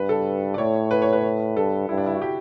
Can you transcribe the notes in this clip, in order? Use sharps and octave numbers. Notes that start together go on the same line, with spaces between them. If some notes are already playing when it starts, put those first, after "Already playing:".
Already playing: G2 B4
A4
D5
A2 C#5
B4
C#5
B4
G2 A4
G2 E4
D4
E4
F#4
G4